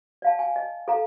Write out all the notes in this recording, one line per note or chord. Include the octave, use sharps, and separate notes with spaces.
D5 F5 A5
G#5
D#5
A4 F5 A#5